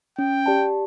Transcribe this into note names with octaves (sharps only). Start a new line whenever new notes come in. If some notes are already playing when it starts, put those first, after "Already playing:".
C#4 G5
G4 D5 A5